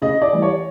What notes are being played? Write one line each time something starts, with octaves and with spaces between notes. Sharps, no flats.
C#3 D#5
D5
E3 G3
C#5